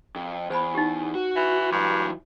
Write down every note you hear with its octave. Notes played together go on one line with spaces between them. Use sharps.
F2
E2 C5 G#5 B5
D#4 G4
F#4
E3
G2 E3 F#3